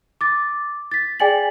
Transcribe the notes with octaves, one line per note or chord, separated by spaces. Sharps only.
D6 A6
A6 B6
G#4 D5 G5 G#5 A6 F#7